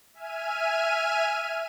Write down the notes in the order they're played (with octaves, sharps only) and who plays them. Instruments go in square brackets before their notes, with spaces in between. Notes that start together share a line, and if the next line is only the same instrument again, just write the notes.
[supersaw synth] E5 G#5 F6 D#7